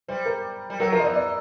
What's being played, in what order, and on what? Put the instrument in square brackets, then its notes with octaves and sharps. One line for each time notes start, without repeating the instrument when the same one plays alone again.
[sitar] G3 [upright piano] C5
[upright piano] A#4
[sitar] G3
[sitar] F#3 [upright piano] A#4
[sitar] F3 [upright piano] A#4
[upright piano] D#5
[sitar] E3 [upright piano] D5
[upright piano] D5